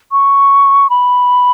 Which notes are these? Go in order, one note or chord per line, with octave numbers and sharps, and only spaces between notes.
C#6
B5